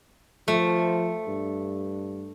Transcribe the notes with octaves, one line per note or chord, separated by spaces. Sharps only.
F3 A3
G2